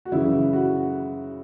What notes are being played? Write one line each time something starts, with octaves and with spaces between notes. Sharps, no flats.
F#4
F#2 C#3 E3 E4
F#4